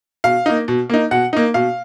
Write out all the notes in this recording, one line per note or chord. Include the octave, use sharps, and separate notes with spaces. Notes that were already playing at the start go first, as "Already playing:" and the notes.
B2 F5
A#3 D#4
B2
A#3 D#4
B2 F#5
A#3 D#4
B2 F5